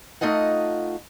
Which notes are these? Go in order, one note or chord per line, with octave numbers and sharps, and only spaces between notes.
A3 D#4 F4 D#5 F#5